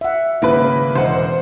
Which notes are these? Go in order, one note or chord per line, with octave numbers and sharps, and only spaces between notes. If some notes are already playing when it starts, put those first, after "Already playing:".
E5 F#5
G#1 C#3 A#3 E4 B4
E1 C5 D#5 F#5